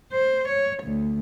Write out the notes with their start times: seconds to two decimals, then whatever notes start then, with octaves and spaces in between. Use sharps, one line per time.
0.12 C5
0.48 C#5
0.83 D2